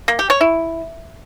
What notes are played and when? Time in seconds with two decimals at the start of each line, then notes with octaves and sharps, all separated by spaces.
0.08 A#3
0.19 G4
0.30 C#5
0.41 E4